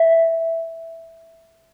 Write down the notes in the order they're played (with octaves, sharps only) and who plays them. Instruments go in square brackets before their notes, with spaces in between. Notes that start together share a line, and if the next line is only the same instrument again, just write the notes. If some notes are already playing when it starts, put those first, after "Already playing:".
Already playing: [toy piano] E5